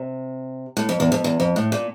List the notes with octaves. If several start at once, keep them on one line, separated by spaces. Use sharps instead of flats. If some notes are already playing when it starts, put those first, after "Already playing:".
Already playing: C3
A2
F2
E2
F2
E2
F2
A2
A#2